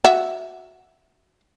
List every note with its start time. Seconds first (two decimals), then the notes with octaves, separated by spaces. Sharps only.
0.04 F#4 E5